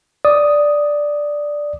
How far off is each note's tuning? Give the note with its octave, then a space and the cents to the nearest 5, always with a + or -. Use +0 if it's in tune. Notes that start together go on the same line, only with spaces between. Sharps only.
D5 +0 D#6 +0